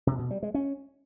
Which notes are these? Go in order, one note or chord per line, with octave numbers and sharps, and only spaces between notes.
C3
B2
G3
G#3
C#4